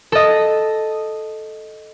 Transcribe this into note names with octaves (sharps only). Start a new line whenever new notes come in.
A4 D#5